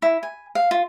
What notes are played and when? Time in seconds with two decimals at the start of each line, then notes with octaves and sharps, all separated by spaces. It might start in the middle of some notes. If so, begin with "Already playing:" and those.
0.02 E4
0.23 G#5
0.55 F5
0.71 F4